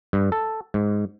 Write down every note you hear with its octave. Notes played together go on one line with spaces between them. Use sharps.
G2
A4
G#2